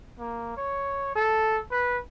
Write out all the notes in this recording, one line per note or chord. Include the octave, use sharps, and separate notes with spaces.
A#3
C#5
A4
B4